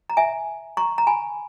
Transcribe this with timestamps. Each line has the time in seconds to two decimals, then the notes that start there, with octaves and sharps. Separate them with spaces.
0.10 A#5
0.17 E5 G#5
0.77 A#5 C#6
0.98 A#5
1.07 G#5 B5